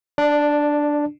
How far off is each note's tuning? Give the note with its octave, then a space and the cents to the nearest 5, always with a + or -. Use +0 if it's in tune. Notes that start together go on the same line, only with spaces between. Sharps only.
D4 +0 D5 +30